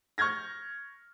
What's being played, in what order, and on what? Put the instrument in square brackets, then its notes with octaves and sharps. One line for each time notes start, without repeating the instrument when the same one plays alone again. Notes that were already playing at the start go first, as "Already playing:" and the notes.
[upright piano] C#6 F6 G6 G#6 A#6